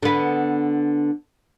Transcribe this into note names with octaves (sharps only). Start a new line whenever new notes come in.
D3 B3